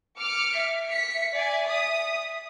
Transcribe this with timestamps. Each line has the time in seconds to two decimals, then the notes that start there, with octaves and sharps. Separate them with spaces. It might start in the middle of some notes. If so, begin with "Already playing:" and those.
0.19 D6 F6 C#7
0.54 E5
0.92 B6 C#7
1.36 D5 G#5
1.69 D#6